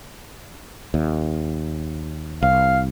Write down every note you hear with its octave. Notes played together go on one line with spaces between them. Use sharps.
D#2
C2 F5